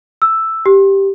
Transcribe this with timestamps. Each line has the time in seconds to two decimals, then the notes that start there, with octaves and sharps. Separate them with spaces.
0.22 E6
0.66 G4